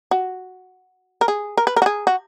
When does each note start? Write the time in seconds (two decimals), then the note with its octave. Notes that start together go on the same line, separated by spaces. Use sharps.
0.11 F#4
1.21 A#4
1.28 G#4
1.57 A#4
1.67 B4
1.76 A#4
1.82 F#4
1.86 G#4
2.07 F#4